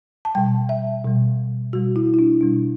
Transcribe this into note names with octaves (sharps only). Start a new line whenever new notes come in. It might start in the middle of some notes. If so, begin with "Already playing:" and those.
A5
B2 G3 G5
E5
B2 G3
B2 G3 F#4
E4
E4
D4
B2 G3 D4